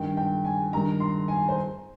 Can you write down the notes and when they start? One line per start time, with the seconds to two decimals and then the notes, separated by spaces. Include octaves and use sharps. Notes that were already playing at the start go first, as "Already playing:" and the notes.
Already playing: G2 D#3 G5
0.17 G5
0.45 G#5
0.73 G2 D#3 A#5
1.00 C6
1.28 G#5
1.49 C5